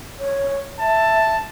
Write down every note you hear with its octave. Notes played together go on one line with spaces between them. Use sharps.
C#5
E5 A5